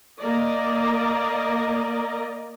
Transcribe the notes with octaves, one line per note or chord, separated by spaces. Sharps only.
A#3 A#4 D5 D#5